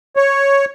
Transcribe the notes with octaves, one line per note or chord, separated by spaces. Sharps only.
C#5